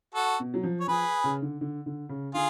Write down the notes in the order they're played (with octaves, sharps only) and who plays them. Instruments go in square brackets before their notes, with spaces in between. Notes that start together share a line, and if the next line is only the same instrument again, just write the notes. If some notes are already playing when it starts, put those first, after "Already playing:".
[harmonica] F#4 A4
[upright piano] B2
F#3
F3
[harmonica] C#5
[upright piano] F3 [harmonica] G#4 B4
[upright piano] C#3
D3
D3
D3
C#3
[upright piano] D3 [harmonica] F4 G#4